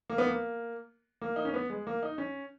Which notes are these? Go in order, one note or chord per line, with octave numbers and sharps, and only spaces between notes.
A#3
B3
A#3
A#3
D#4
C#4
B3
G#3
A#3
D#4
C#4